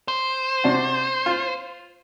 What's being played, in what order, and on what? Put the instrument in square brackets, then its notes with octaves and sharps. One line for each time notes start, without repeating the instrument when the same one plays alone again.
[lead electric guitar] C5
[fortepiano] C3 D4 F#4
F4